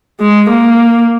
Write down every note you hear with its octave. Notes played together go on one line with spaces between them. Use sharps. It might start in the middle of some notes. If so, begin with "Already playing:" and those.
G#3
A#3